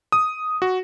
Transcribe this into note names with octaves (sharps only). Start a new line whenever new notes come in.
D#6
F#4